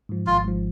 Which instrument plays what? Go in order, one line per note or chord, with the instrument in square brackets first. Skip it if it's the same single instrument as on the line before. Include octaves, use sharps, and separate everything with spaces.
[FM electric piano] G#2 F3
[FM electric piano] G#1 [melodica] F4
[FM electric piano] G#2 F3